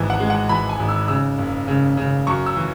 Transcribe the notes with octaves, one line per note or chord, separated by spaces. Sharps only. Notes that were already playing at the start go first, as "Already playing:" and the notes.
Already playing: G#1 E3
F#5
G#3
F#5
E3 B5
G#5
G#1
E6
C#3 E6
F#1
C#3
C#3
F#2 C#6
E6
E3